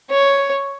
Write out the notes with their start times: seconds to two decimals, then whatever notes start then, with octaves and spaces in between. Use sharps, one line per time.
0.11 C#5